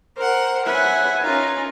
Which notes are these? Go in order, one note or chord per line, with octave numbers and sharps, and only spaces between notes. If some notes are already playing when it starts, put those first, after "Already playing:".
A#4 C5 F#5
B4 C#5 E5 F#5 G#5
C#4 D#4 F4 A#4